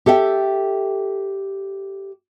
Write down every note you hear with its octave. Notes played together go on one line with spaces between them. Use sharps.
G4 A4 E5 F5 G5